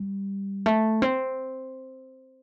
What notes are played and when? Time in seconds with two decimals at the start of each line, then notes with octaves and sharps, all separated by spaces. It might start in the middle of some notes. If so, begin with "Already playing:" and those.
Already playing: G3
0.66 A3
1.02 C4